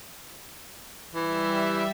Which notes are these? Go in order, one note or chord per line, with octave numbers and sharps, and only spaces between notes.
E3 G3 E5